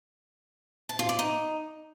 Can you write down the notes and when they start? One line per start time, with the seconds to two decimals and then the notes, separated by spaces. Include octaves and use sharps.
0.89 A5
0.99 F4
1.09 D5
1.19 D#4